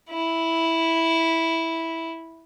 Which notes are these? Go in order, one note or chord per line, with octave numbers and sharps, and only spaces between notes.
E4